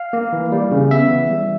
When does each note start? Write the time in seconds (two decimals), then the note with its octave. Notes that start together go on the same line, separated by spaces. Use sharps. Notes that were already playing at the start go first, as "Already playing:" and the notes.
Already playing: F5
0.13 A#3
0.33 E3
0.52 G3
0.71 C#3
0.91 B3 E5
1.10 E3
1.30 G3